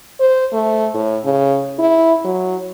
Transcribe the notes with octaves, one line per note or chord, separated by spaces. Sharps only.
C5
A3
A2
C#3
E4
F#3